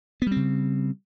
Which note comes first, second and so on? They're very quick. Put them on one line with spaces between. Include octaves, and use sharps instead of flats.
B3 G3 C4 C#3